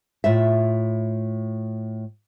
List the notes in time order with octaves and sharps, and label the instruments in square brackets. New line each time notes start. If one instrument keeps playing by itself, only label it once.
[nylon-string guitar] A2 F4 E5